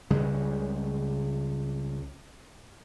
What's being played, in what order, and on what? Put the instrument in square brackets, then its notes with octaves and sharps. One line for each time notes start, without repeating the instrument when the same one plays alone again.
[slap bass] C#2 C#3 G3 G#3